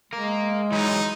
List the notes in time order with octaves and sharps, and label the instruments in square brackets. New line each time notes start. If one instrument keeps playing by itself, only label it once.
[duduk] G#3 [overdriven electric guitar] A#3 A#4
[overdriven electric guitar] E3 F#3 [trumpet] D#4